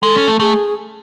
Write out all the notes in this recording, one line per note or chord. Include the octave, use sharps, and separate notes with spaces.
G#3 A4
C#4
A3
A3 G#4